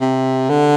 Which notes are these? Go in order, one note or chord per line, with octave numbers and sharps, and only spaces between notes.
C3
D3